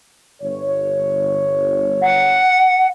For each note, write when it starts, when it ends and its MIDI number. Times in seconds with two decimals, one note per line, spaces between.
0.41 2.47 31
0.41 2.47 73
2.02 2.87 78